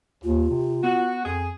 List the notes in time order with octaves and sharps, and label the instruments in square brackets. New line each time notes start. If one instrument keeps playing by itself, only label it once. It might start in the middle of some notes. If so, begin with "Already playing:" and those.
[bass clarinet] D#2 [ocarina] F4
[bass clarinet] C3
[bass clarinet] B3 [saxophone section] F#4
[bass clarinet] F2 [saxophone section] G#4